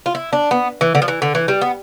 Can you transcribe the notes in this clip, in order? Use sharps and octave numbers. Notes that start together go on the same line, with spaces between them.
F4
E4
D4
B3
E3
D3
F3
E3
D3
E3
G3
B3